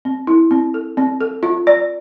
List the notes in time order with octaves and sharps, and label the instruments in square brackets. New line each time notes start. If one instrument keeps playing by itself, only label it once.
[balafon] C4
E4
C4
A4
C4
A4
F4
D5